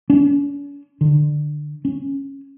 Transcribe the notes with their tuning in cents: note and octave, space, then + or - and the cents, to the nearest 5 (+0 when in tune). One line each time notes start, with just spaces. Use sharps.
C#4 +45
D3 +20
C#4 -10